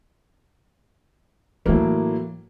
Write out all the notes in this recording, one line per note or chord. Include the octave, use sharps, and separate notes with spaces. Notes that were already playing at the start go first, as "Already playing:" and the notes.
A2 E3 F#3 A3 A#3